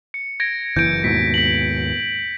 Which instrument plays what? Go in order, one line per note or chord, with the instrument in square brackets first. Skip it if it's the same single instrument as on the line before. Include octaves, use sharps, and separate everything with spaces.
[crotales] C#7
G#6 A#6 D7
[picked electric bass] F#1 E3 [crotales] G6 D7
[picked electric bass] D#2 G#2 B2 [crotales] B6
[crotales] B6 F#7